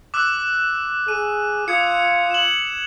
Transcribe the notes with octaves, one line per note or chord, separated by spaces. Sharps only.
D6 E6 F#6
G#4 D#7
F4 D#6 G#6 C#7
E7 F#7